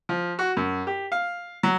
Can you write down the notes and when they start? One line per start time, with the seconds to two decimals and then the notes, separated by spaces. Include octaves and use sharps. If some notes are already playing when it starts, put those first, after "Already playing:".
0.09 F3
0.39 F#4
0.57 F#2
0.87 G4
1.12 F5
1.63 F#3